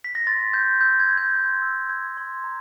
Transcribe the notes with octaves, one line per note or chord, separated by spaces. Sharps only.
B6
A#6
C6 A6
C6 G6
E6 G6
G#6
C6
G6
C6
E6
G6 G#6
C6
A#5